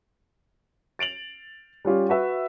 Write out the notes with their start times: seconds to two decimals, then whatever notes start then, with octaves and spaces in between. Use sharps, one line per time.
0.99 A6 D7 F7 F#7
1.85 G3 C#4 F4 G4
2.09 F#4 B4 E5